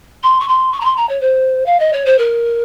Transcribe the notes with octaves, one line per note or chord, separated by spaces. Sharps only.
C6
C#6
C6
C#6
A#5
C6
A#5
C#5
C5
F5
D#5
C#5
C5
A#4